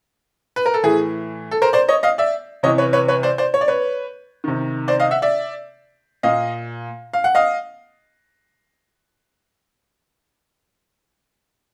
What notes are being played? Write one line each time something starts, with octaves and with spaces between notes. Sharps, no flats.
B4
A#4
A4
A2 E3 G#4
A4
A#4 C5
C5 D5
C#5 D#5
D#5 F5
D5 E5
C3 E3 C#5 D#5
B4 C#5
B4 C#5
B4 C#5
C5 D5
C5 D5
C#5
D5
B4 C#5
C3 D#3
C5 D5
D#5 F5
E5 F#5
D5 E5
A#2 D#5 F5
F5
F#5
D#5 F5